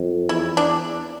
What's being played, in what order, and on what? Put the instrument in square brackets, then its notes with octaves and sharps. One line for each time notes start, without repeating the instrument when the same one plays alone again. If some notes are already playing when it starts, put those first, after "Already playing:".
Already playing: [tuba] F2
[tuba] E2 [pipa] E4
[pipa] D4